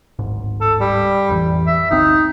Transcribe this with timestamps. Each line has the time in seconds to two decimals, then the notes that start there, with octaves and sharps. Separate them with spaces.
0.19 D1 G#1 G#2
0.61 A4
0.80 G3
1.29 A1 F2 E3
1.67 E5
1.91 G1 D2 C4 D#4